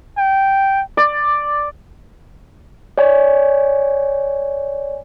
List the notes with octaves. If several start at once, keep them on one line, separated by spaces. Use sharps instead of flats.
G5
D5
C#5 D5 G#5